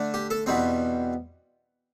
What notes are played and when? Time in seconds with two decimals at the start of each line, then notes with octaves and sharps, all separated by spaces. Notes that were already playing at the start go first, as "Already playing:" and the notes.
Already playing: D3 A3 D4
0.14 G4
0.31 A4
0.46 E2 B2 G3 C4